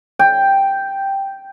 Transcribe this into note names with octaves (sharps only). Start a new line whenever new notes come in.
G5